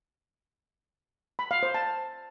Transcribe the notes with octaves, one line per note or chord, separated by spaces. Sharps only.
B5
F5
C5
A5